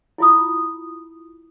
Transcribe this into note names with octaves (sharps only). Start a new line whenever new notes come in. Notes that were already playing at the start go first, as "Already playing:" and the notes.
E4 F4 D#6